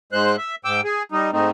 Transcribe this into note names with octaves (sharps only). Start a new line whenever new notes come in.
G#2 G#3 C5 F#6
E5
G#2 G5 D6 E6
G#4
G3 D#4
G#2 A3 C4 D#4